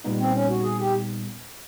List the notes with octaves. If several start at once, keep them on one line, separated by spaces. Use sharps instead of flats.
A#2 G3 B3 D#4
C4
C#4
F#4
G#4
G4